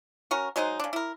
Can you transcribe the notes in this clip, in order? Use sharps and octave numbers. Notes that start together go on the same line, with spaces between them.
C#4 F#4 A#4
F#3 G#3 D#4 C5
C#3 D4
E4 A#4